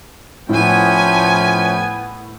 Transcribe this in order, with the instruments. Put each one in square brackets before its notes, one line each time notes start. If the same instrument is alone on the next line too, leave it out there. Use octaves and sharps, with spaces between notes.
[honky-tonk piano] A2 [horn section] F3 A3 C#4 [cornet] B3 [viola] G5 G#5